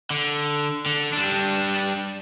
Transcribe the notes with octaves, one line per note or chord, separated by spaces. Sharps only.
D3
D3
G3 D4